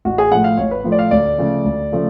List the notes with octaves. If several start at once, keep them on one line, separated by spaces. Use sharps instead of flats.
A1 F#4
G#4
A2 F3 A3 F#5
F5
A1 C#5
B4
A2 F3 A3
D5
F5
D2 D5
C#3 F3 A3
D2
C#3 F3 A3